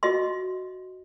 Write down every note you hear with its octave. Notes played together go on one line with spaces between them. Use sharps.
F#4 D#5 E5 C6